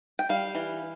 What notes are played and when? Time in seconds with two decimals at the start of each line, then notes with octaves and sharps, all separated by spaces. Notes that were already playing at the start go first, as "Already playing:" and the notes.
0.19 G5
0.29 G3 F5
0.55 E3